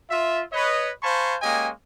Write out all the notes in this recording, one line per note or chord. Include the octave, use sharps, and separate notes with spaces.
F4 E5
B4 C#5 D#5
C5 F5 G#5 A5 B5 C#6
G#3 A#3 C#4 G4 D#5 G#5